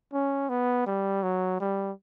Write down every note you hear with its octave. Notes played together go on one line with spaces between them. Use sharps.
C#4
B3
G3
F#3
G3